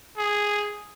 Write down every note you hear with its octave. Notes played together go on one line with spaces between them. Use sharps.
G#4